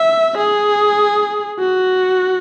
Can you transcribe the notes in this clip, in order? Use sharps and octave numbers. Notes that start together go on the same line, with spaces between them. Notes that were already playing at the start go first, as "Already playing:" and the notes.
Already playing: E5
G#4
F#4